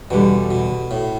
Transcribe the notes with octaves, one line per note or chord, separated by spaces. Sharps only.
E2 B2 D3 G3
B2
A2